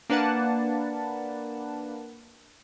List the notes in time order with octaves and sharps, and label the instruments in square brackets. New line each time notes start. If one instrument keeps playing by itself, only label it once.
[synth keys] A#3 D4 B4 F#5 A5